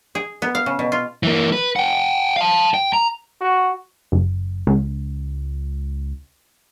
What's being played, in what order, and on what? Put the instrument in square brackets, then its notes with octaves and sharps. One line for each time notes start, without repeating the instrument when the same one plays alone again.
[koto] G#4
B3
F5
C#3
B2
F4
[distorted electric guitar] E3 A#3
B4
F#5 G5
F5 A5
G5
A#5
[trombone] F#4
[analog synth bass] F#1
C#2